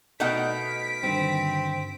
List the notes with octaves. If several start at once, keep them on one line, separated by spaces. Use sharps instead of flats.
B2 A3 D#4 F#5 F6 B6 D7
G2 D3 D#3 C4